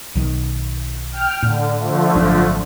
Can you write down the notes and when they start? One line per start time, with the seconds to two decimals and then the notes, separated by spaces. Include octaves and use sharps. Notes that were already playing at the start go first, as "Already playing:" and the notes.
0.15 B1 D#3
1.12 G5 F6
1.43 A2 D3
1.77 D3 F3 A3
2.15 G#1 F#2 D4